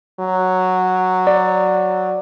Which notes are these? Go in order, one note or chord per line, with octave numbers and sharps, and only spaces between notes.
F#3
D5